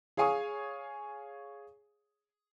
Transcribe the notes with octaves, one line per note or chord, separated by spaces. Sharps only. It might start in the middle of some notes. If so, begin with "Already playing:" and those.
G#4 C#5 F5 G#5 C#6 D#6